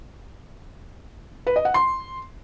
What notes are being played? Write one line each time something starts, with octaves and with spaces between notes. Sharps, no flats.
B4
D#5
F#5
C6